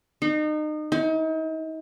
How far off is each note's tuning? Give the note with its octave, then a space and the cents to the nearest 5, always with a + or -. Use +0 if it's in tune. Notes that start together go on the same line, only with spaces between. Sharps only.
D#4 -30
D#4 +40